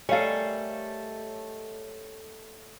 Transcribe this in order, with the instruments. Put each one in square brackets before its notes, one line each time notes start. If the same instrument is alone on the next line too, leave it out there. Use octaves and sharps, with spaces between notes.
[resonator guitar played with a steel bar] G3 [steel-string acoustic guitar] A3 A4 [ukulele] A#4 F5 G#5 [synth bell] C#5 D#5